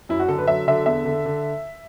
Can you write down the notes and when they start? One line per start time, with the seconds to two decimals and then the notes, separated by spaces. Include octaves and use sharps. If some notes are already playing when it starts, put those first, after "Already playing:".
0.09 F#2 E4
0.20 F#4
0.28 D3 A4
0.38 B4
0.47 F#3 E5
0.68 D3 E5
0.86 E2 E5
1.05 D3
1.25 D3